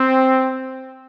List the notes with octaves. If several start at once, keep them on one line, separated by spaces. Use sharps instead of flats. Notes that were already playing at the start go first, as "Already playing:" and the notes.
Already playing: C4